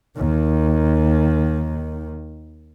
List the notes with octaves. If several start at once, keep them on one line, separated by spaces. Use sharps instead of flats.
D#2 D#3